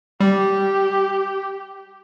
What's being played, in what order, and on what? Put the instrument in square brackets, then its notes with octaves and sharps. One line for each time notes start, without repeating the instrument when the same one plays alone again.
[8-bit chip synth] G3 [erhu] G4